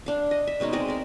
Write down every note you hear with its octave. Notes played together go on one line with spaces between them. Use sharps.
D4 F5
D#5
E5
B2 G#3 C#4 D#4
G#3 C4 D5 D#5
A#4 D5